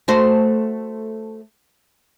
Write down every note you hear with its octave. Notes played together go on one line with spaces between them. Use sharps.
A3 F#4 C5